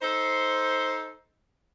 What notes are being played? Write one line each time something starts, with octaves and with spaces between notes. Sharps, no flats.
D#4 A4 C5